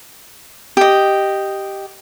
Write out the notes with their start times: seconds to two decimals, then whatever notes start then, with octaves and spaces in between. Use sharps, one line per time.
0.77 G4 D#5